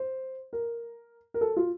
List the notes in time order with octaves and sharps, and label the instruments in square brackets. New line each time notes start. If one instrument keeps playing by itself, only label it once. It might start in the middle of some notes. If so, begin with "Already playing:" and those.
Already playing: [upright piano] C5
A#4
A#4
A4
F4